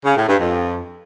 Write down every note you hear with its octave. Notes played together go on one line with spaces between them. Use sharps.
C#3
A2
G2
F2